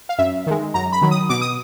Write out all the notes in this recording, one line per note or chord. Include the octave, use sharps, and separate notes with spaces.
F5
F#2 E5
D#3 G#3
F#2 A#5
B5
D#3 F#3
D#6
B2 D6
D#6